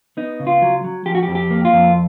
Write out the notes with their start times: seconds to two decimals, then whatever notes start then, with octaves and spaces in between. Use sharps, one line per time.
0.17 B3 D#4
0.40 C#3
0.47 F4
0.62 F#3
0.84 F#3
1.06 F3 G4
1.15 F#4
1.23 G4
1.28 F2
1.35 G4
1.51 A#3
1.65 F4
1.73 F2